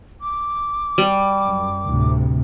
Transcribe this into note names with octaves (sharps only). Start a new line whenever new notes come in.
D6
G3
F#2
D2 A2 C3